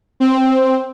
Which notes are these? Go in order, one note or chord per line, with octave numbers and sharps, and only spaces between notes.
C4